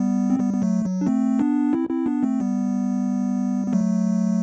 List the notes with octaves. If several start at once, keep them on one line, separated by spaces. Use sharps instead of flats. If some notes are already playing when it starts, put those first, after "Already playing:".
Already playing: G3 B3
C4
G3 B3
B3
F#3 A3
F#3
D4
A3 C4
B3 D4
C4 E4
C4 E4
B3 D4
A3 C4
G3 B3
B3
F#3 A3